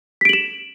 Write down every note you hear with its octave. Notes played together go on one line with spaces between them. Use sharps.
B6 D7 E7 F#7